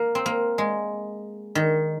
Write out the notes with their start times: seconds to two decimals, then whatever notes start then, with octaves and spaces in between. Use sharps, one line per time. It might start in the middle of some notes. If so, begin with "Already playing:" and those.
Already playing: A#3
0.15 C4
0.26 A#3
0.58 G#3
1.55 D#3